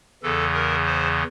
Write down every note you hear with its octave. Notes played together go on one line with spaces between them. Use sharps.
E2 C#3 E3 A4
A#4
C5